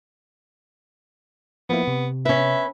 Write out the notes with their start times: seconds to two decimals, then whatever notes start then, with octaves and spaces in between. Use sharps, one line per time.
1.70 F3 A#3 B3 E4
1.88 C3
2.25 C#4 B4 E5